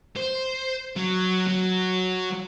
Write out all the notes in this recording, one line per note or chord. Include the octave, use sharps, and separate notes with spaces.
C5
F#3
F#3